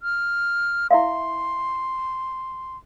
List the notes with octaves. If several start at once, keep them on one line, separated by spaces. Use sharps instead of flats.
F6
E4 E5 F5 C6